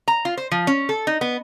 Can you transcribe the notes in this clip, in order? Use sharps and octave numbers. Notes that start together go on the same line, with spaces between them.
A#5
F4
C5
F3
C#4
A4
D#4
B3